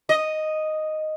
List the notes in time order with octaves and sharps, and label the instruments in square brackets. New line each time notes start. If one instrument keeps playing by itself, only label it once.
[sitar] D#5